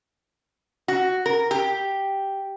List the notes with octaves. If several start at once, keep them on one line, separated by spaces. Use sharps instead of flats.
F#4
A#4
G4